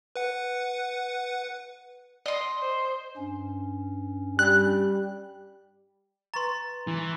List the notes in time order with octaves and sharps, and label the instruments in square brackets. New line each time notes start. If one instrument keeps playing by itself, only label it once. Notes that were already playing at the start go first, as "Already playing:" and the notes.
[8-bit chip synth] B4 F#5
[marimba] D5 [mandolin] D#5 C6
[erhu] C5
[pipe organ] G2 C#4
[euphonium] G3 [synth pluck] F#6
[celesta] B4 C#6 A6 [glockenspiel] A#5 C6
[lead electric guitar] E3